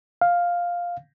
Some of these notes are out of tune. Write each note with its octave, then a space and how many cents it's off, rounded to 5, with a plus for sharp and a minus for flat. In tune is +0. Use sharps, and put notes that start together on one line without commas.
F5 +5